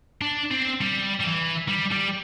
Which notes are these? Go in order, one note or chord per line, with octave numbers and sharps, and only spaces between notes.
D4
C4
G3
G3
E3
G3
G3